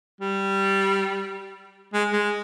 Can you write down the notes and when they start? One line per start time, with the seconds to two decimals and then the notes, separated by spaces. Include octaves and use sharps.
0.21 G3
1.94 G#3
2.13 G#3